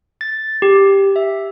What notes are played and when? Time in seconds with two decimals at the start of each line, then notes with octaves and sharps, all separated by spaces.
0.21 A6
0.62 G4
1.16 E5